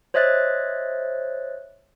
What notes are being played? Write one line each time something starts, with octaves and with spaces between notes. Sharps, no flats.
C5 C#5 D#5 E5 F#6 A6